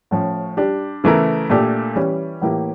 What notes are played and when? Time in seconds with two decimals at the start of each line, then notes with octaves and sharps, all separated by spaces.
0.11 A2 F3 C#4
0.57 G3 D4 G4
1.04 C#3 E3 A3 E4 A#4
1.50 A#2 A3 D4 G4
1.95 E3 G3 C#4
2.42 A2 E3 A#3 E4 G4